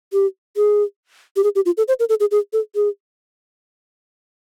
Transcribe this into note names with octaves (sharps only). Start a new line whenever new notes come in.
G4
G#4
G4
G#4
G4
F4
A4
C5
A#4
A4
G#4
G#4
A4
G#4